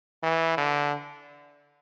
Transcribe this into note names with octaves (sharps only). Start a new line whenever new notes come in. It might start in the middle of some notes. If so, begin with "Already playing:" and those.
E3
D3